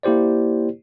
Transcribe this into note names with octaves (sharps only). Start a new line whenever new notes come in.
A#3 E4 G4 C5 D5